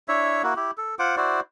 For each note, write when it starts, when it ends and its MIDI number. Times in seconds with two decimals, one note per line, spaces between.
0.08 0.42 62
0.08 0.42 64
0.08 0.42 73
0.08 0.42 76
0.43 0.54 58
0.43 0.54 64
0.43 0.54 66
0.56 0.71 64
0.56 0.71 67
0.78 0.95 69
0.99 1.16 65
0.99 1.16 72
0.99 1.16 78
0.99 1.16 86
1.17 1.40 64
1.17 1.40 66
1.17 1.40 72
1.17 1.40 74